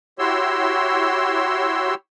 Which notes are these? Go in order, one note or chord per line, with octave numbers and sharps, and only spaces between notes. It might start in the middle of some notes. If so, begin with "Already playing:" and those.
E4 F#4 G4 C#5 C6 E6